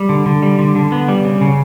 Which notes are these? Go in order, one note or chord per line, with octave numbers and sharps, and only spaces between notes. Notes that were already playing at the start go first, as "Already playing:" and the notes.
Already playing: G3
D3
D3
G3
D3
D3
B3
G3
C#3
C#3